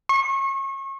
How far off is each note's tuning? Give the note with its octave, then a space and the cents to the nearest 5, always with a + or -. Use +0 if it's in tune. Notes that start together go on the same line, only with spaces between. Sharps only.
C#6 -35